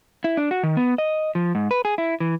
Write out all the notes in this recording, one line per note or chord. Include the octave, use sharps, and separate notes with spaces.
E4
D4
F#4
D#3
B3
D#5
F3
G#2
B4
G#4
E4
E3